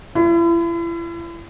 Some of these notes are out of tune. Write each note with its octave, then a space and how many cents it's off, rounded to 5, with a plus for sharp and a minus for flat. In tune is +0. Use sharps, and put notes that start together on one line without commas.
E4 +40